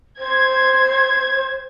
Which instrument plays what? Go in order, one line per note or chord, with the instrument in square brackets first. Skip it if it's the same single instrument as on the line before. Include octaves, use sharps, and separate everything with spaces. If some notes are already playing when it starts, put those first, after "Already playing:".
[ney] C5 [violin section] G#6